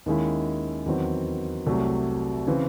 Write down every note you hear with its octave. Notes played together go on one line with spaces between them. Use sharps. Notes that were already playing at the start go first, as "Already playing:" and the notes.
D#2 D#3 G#3 C#4 E4
E2 D#3 F#3 C4
C2 C3 F#3 A3
C#3 E3 C4